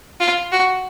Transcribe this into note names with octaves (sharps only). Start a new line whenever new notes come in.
F4
F#4